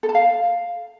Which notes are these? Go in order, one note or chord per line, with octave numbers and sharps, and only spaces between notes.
A4
A5
F5